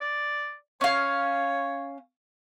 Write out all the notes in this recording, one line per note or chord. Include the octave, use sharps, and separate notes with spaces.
D5
C#4 C#5 F5